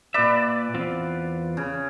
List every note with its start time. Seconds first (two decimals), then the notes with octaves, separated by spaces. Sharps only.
0.14 A#2 B4 D5 E5
0.74 E2 C4 F4
1.57 C#3